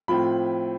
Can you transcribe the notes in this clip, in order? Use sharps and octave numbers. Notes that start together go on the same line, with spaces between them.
A2 F3 C4 F4 B5